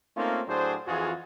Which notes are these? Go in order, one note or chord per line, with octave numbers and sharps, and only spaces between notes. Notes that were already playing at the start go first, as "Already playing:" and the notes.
A3 A#3 C4 C#4 D#4 F4
A2 F#3 D4 G#4 C5
F2 E3 F4 F#4 G#4